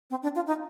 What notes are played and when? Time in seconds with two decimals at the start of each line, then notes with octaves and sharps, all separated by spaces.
0.10 C4
0.23 D4
0.36 F4
0.47 D#4